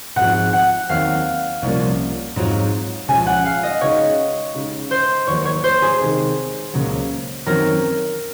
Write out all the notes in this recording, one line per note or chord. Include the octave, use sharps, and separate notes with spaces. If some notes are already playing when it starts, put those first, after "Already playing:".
G#2 F3 G#3 C4 F#4 F#5
F#5
D#2 D#3 F#3 C4 F5
C2 A#2 F3 A#3 C#4
G#2 F#3 C4 F4
C#2 C#3 F3 G#3 C#4 G#5
F#5
F5
D#5
C#3 G#3 D#4 F#4 C#5
C#3 G#3 D#4
C5
D#2 D#3 F#3 A#3 C#5
C#5
C5
G#4
C3 D#3 G#3 D#4
C#2 C#3 F#3 A#3
F#2 D#3 F#3 C4 A#4